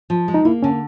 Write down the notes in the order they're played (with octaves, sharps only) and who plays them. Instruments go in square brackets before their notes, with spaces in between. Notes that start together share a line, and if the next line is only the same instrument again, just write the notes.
[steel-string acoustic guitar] F3
G#3
[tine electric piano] D#4
[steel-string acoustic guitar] A#3 [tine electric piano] E4
[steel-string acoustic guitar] D3 [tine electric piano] C#4